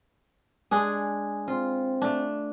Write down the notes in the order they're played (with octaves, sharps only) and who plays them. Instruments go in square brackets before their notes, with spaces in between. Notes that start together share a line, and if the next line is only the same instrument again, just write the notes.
[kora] G#3 D4 G#4
[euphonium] C4 [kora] F4
[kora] A3 D4